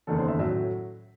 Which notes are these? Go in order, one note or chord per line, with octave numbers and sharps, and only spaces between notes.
F#1 E2 D#3 A3 A4
C5
E5
A2 F#3 E5